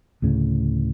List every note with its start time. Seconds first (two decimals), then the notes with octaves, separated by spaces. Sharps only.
0.22 D2 A2 C#3